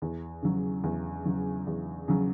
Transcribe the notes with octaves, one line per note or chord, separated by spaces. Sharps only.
E2
C#3 F#3
E2
C#3 F#3
E2
C#3 F#3